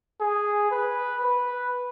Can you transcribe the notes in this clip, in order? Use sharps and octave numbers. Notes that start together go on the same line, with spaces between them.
G#4
B4
B4